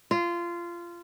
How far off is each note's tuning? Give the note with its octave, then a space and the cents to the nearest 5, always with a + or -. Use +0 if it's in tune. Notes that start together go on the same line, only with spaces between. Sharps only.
F4 -20